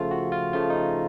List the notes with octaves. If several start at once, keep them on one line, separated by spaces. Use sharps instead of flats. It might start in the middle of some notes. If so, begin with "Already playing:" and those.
Already playing: C#3 F3 A3 F4
F#4
F4
C#3 F3 A3 F4
D#4